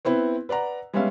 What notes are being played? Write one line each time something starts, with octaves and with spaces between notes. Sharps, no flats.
B3 C4 E4 B4
B4 D5 F#5 A#5
G3 G#3 B3 C#4 E5 F5